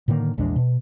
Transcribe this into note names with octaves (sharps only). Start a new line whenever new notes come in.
A2 D3 D#3 A#3
A#1 E2 G#3 D4
B2